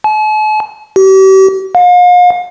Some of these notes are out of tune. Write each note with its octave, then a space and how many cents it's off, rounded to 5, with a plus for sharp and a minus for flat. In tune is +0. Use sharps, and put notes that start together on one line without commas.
A5 -45
G4 -40
F5 +40